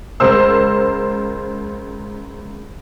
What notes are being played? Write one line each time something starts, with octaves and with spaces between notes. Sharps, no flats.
C#2 A#4 C5 E6